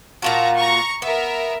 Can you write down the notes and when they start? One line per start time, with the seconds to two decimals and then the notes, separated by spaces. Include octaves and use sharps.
0.22 A#2 F4 F#4 A5 A#5 C#6
0.55 A#5 C#6
1.02 B3 A#4 E5